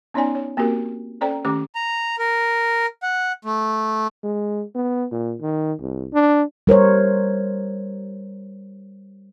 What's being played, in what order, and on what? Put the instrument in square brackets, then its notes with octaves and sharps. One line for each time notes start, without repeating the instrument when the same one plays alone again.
[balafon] B3 C#4 D#4 C#5 D5 G#5
C#5
A#3 C4 F#4 G4 A#4
C#4 A4 C5 D5 G5 A#5
D#3 A3 C#4 G4 D6
[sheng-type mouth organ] A#5
A#4
F#5
A3
[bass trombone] G#3
B3
A#2
D#3
C2
D4
[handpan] G3 A#4 C5 C#5